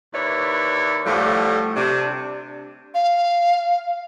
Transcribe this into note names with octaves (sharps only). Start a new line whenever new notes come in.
D#2 E4 B4 C#5 D5
A2 D3 F3 G3 A3
C3 D4
F5